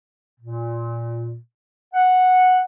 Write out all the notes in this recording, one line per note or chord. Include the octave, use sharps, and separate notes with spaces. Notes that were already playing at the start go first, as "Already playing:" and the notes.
A#2
F#5